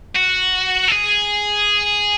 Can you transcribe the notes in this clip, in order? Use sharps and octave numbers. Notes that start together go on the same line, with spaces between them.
F#4
A4
G#4